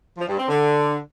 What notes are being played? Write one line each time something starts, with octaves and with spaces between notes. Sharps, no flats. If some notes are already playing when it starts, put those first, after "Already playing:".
F3
G2
C4
D3